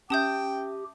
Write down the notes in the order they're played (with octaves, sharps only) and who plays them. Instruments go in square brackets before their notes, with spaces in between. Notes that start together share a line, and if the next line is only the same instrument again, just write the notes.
[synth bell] C#4 E5 [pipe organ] G4 [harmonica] G5 [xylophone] A5 D#6 G6